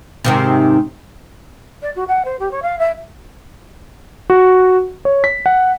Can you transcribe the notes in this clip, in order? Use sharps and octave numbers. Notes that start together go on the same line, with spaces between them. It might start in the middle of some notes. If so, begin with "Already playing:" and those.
G#2 C3 D#3
D5
F#4
F#5
C5
G4
C#5
F5
E5
F#4
C#5
B6
F#5